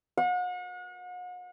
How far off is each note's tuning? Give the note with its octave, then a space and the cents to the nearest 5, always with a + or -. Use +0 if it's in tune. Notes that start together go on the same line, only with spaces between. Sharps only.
F#5 -40